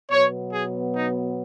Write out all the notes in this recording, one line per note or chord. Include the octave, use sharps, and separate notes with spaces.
B2 F#3 B3 C#5
G#4
D#4